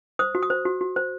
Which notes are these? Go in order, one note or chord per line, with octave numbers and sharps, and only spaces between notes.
C5 D#6
F#4
D#6
C5
F#4
F#4
C5